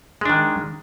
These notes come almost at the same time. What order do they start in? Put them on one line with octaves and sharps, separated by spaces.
G#3 D4 D#3